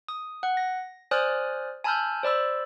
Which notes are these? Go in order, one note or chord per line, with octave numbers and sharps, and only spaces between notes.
D#6
F#5 F#6
A#6
C5 D5 G#5 D#6 F6 F#6
G#5 A5 B5 E6 F6 G6
C5 D5 B5 E6